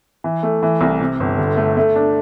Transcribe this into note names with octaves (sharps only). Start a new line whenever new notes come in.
E3
A3
E3
C2
C3
G1
D3
A3
A3
D4